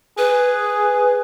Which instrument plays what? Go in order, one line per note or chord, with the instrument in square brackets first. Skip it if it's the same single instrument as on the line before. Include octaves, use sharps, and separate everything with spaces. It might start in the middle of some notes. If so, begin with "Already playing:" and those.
[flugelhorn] G#4 [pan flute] B4